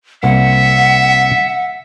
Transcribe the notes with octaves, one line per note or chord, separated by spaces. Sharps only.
C2 A#3 E5 F#5